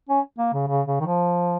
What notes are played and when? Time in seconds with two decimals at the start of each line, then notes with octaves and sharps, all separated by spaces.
0.09 C#4
0.38 A#3
0.53 C#3
0.68 C#3
0.87 C#3
1.00 D#3
1.06 F3